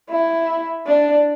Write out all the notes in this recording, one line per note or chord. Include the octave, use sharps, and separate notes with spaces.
E4
D4